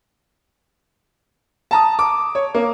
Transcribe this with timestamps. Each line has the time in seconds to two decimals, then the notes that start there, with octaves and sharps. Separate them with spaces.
1.71 A5 A#5 D#6
1.99 D6
2.35 C#5
2.55 A#3